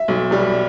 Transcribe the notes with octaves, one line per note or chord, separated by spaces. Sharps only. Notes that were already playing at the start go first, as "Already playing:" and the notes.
Already playing: E5
B1
B2 G3